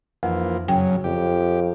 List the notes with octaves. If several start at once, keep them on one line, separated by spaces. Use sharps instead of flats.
F2 E3 F3 A#3
F#2 C#3 F#3 G5
F2 G4